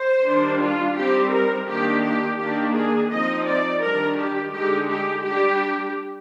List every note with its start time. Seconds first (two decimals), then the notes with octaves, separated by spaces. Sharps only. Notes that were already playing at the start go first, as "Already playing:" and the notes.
Already playing: C5
0.25 D#3 G3 D4
0.61 F4
0.97 G3 C4 D#4 G4
1.32 A#4
1.68 D#3 A#3 D4 G4
2.04 G4
2.39 D#3 A#3 D4 G4
2.75 G#4
3.11 F3 C4 D#4 D#5
3.46 D5
3.82 D#3 G3 D4 A#4
4.18 G4
4.53 D3 G#3 D#4 G4
4.89 G4
5.25 G3 D4 G4